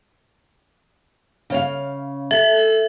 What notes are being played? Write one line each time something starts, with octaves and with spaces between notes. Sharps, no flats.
C#3 C#5 F5
A4 E5